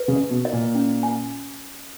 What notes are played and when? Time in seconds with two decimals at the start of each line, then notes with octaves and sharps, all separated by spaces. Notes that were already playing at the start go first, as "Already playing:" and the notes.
Already playing: B4
0.08 C#3
0.16 D#5
0.30 B2
0.45 D#5
0.53 A#2
0.75 C#4
1.03 G#5